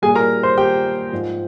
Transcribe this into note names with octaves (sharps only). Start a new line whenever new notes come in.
A#2 G3 G#4 G#5
A#4 A#5
C5 C6
G4 G5
G#2 F3